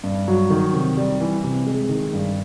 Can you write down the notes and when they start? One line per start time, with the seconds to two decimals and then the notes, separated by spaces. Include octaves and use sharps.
0.04 G2
0.28 F#3
0.50 D#3
0.73 C3
0.97 G3
1.20 E3
1.44 C3
1.66 G#3
1.89 D#3
2.13 G2